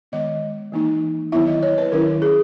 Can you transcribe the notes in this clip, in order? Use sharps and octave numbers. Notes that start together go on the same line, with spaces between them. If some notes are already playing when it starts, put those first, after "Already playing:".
D#3 G#3 B3 D#5
E3 A#3 D#4
D#3 F#3 B3 E4 E5
D#5
C#5
B4
D#3 F#3 C#4 E4 A#4
G#4